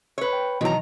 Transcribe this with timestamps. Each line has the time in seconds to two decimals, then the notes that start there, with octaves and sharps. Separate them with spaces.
0.18 B4 C#5
0.33 G5
0.61 B2 D#3 E3 F#3 A#5